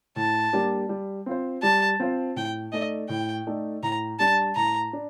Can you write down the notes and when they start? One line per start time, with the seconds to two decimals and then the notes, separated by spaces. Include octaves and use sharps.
0.16 A2 A5
0.53 G3 A#3 D4 G4
0.89 G3
1.26 C4 F4 C5
1.63 G3 A5
2.00 C4 F4 C5
2.36 A2 G5
2.73 A3 D#4 A4 D5 D#5
3.09 A2 G5
3.47 A3 D#4 A4 D5
3.83 A2 A#5
4.20 G3 D4 A5
4.56 A2 A#5
4.93 D4